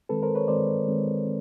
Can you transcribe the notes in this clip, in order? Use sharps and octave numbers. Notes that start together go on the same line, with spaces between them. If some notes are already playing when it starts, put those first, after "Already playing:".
D#3 G#3 C4 A4 B4
A#4 C5
B4 C#5
D#3 G#3 C4 C5 D5
D#3 G#3 C4
C4